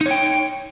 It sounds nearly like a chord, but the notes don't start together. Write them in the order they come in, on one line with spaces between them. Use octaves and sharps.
D#4 C#5 G5